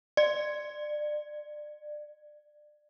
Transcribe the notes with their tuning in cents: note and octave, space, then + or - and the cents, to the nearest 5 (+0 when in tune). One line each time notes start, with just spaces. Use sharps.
D5 +25